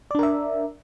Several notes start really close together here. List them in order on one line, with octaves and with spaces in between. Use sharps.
D5 D4 A#4 E5